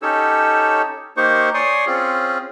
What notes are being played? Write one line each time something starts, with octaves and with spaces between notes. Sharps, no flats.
C#4 D#4 G4 A4 C#5 E6
A#3 D#4 G4 C5 C#6
C#5 D5 G#5 C6 C#6 D#6
C4 C#4 F4 G#4